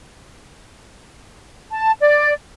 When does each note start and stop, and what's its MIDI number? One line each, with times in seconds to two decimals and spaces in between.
1.72 1.92 81
2.01 2.33 74